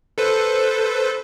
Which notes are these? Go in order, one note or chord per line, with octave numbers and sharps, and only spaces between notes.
A4 B4 C5